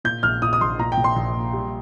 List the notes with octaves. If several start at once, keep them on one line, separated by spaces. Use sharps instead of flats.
A#2 G6
A#1 F6
A#2 D#6
D#6
A#1 C6
A#2 A#5
G5
A#2
C6
A#1
A#3
G3